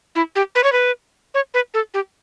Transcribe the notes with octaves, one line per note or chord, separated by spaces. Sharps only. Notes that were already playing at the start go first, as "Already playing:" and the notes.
E4
G4
B4
C#5
B4
C#5
B4
A4
G4